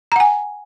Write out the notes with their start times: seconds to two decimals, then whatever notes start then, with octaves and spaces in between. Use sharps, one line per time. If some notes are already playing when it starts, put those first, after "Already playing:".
0.12 A#5
0.16 F#5
0.20 G#5